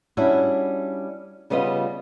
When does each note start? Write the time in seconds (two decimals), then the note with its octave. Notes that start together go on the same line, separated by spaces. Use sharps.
0.17 G3 C#4 D4 E4 F#4
1.50 C#3 G3 B3 F4 D#5